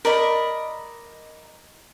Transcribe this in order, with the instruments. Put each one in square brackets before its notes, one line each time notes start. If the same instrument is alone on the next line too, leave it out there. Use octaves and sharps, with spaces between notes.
[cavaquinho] A#4 D5 D#5 B5